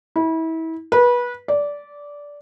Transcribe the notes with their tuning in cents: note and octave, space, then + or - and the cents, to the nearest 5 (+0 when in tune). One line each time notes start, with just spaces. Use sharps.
E4 -30
B4 -25
D5 -15